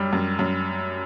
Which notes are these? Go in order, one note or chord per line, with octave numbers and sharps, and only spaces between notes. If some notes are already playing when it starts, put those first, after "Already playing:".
Already playing: F#2 G3
F#2
F#2